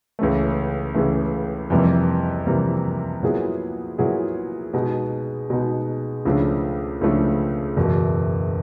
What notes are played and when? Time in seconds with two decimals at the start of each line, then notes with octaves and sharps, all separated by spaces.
0.19 C#2 C#3 E3 A3
0.95 C#2 C#3 E3 A3
1.70 F2 C3 E3 G3 A#3
2.46 F2 C3 E3 G3 A#3
3.23 A#2 F#3 B3 E4 G#4
3.98 A#2 F#3 B3 E4 G#4
4.74 B2 G#3 B3 D#4
5.50 B2 G#3 B3 D#4
6.25 C#2 C#3 F3 A3 D4
7.01 C#2 C#3 F3 A3 D4
7.77 F#1 E2 B2